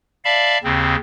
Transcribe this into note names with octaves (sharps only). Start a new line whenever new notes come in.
D5 E5 F5 A5 B5
D#2 C#3 C4